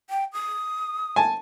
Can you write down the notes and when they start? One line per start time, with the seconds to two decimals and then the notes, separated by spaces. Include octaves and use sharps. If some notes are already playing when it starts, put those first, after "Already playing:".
0.10 G5
0.33 D#6
1.16 G#5 A5